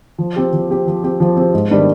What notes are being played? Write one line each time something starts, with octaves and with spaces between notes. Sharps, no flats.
F3
C4 G4
F3
C4 G4
F3
C4 G4
F3
C4 G4
G#2
D#3 G3 B3 D4